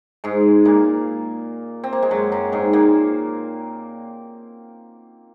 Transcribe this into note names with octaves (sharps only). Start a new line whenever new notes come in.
G#2 G#3
A#2 A#3
C4
A#3
G#3
F#2 F#3
F#2 F#3
G#2 G#3
A#2 A#3